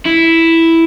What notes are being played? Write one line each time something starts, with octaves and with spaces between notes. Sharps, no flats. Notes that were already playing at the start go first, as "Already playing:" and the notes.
E4